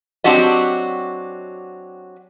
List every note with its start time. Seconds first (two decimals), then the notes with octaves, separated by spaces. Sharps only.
0.24 F#3 C4 D4 F#4 G4 D#5